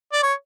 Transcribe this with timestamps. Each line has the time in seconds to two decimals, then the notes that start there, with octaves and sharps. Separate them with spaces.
0.12 D5
0.23 C#5